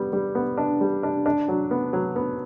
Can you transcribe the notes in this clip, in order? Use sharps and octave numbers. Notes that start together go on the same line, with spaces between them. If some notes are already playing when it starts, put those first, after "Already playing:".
Already playing: G3 B3
G3
B3
D4
G3
D4
D4
F#3
B3
F#3
B3